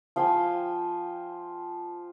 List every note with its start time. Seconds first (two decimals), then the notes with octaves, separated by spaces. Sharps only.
0.16 F3 F5 G5 G#5